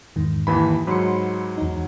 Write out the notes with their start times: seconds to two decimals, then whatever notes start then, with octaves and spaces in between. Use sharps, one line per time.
0.16 E2 G#2 D#3
0.47 D#2 E3 B5
0.87 G#2 F#3 B5 C6 C#7
1.58 E2 D#4